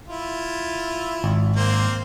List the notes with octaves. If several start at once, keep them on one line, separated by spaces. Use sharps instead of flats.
E4 F4
G#1
A#3 C4